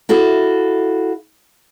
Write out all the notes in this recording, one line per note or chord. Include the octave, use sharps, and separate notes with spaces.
E4 F#4 A4 F5